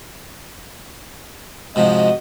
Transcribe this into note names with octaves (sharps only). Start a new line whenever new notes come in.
G#2 C3 F3 F#4 D#5